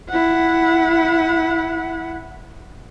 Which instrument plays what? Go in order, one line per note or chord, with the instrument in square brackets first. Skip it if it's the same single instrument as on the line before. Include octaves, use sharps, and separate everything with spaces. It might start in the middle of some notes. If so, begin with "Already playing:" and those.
[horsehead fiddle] E4 F#5